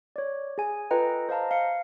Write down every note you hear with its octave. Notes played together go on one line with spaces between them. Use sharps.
C#5 D5
G#4 G#5
F4 A4 B4 D#5 G5 A#5
C5 D#5 F5 A5 A#5
F5 C#7